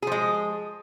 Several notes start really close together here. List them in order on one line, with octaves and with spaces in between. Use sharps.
G#4 F3 G#3